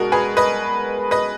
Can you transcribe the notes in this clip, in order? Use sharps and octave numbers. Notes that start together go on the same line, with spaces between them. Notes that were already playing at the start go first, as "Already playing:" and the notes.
Already playing: B2 G#3 F#4 A#4
G#4 B4
B4 D#5
B4 D#5